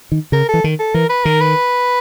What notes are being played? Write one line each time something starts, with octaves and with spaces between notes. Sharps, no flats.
D#3
C#3 A#4
E3 A4
D#3
A4
E3 A#4
B4
D#3 A#4
B4